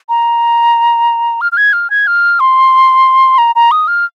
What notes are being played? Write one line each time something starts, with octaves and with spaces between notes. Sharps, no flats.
A#5
F6
F6
G#6
F6
G#6
F6
C6
A#5
A#5
D#6
F6